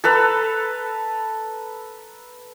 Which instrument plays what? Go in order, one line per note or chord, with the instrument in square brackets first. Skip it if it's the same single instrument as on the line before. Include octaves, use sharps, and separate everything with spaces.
[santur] A4 B4 A#5 E6